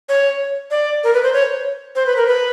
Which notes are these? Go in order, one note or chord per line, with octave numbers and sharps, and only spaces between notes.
C#5
D5
A#4
B4
C5
C#5
C5
B4
A#4
B4